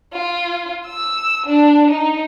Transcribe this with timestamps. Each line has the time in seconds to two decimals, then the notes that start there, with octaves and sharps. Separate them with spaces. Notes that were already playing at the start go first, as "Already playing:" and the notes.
0.13 F4
0.86 E6
1.46 D4
1.90 D#4